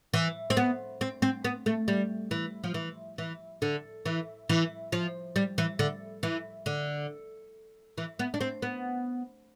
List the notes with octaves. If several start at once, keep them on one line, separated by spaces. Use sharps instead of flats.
E3
C4
B3
C4
C4
B3
A3
G3
E3
F3
E3
E3
D3
E3
E3
F3
G3
E3
D3
E3
D3
E3
B3
D4
C4
B3